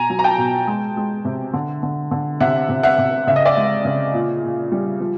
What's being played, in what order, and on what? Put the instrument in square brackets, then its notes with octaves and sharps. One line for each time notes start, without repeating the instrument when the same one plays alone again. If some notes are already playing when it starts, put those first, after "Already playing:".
Already playing: [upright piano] B2 G#5 A#5
F#3
A#5
G5 A5
B2
G#3
G#3
C3
D3
D3
D3
C3 E5 F#5
C3
E5 F#5
C3
C#3 E5
D#5
D5 E5
G#3
C#3
A#2
A#2
G3
F3